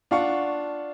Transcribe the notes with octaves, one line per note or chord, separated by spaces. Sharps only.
D4 F4 F5 F#5 C#6